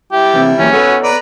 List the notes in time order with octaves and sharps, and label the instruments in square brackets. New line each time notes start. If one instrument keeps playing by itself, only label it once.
[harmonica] G3 E4 [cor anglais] G4
[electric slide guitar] E2 C3
[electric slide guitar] E3 F#3 A#3 [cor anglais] C#4
[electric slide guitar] B3 A4 C#5 [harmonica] F#4 B4 G#5
[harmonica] B4 D5 A#5